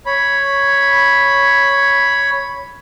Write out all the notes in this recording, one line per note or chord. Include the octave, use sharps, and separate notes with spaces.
C#5 B5